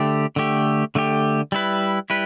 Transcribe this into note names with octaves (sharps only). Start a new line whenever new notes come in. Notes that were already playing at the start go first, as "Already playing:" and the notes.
Already playing: D3 A3 G4
D3 A3 G4
D3 A3 G4
G3 E4 B4
G3 E4 B4